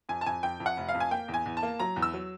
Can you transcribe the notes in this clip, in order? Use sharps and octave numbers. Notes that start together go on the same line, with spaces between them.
F2 G#5
A5
F2 G#5
F2 G5
F2
F#5
F1
F5
F2
G#5
A#3 G5
E2
G#5
E2
A5
A#3
F#3 A#5
E2
E6
F#3